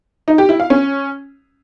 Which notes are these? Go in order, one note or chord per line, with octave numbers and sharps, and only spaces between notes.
D#4
G4
E4
F5
C#4